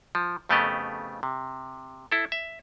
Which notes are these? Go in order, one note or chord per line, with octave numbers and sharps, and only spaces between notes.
F3
F2 C#3 A3 B3 G4 D#5
C3
E4 A4
E5